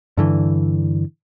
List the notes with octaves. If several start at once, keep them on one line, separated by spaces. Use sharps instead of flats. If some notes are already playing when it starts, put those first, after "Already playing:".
G2 D3 E3